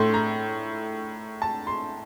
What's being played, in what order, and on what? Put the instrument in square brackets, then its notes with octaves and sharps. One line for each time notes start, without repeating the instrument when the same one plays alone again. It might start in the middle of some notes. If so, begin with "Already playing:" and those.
Already playing: [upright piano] A2 A3 C6
A#5
A5
C6